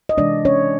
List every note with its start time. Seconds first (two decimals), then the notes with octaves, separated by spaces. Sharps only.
0.09 D#5
0.18 C3 E3 G#3 D4 D5
0.45 C#4 C#5